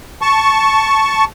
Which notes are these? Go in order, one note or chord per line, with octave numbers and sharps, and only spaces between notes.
A5 C#6